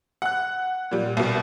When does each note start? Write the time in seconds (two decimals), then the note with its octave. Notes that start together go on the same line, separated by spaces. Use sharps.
0.22 F#5 F#6
0.91 A#2 G3
1.17 C2 B2